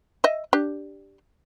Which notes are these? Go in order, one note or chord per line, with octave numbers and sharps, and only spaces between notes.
D#5 E5
D4 G4